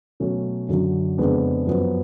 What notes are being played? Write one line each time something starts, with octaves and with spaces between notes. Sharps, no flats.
B2 F#3 A3 C#4
F#2 D3 F#3
F2 C#3 G#3 B3 D4
F#2 F3 B3